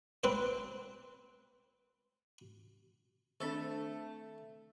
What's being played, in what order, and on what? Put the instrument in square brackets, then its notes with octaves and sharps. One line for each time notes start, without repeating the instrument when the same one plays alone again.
[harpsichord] C4 B4 C5
[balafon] D#3 C4 D4 [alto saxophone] A3 [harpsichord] A4